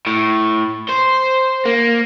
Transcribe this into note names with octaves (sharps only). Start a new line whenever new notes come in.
A2
C5
A#3